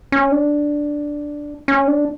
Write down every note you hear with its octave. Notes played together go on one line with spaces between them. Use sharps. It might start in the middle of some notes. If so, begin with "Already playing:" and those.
C#4
D4
C#4
D4